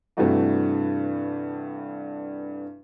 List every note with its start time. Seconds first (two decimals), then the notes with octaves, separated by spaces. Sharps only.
0.17 G2 C3 E3 G3 A3 F#4